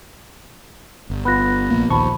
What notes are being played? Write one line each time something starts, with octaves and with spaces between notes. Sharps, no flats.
G1
B3 F4 B5 F#6 A#6
A#1 A#3
A#1 D#2 F3 A5 B5 C#6